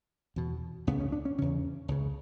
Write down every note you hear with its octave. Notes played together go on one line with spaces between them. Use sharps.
E2 B2
C#2 C#3 B3
C#4
D4
C#4
E2 C#3 C#4
C#2 C#3